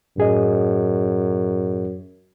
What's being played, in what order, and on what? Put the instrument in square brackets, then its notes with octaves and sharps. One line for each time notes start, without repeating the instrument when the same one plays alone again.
[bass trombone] F#2 [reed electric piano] A2 G#4 D#5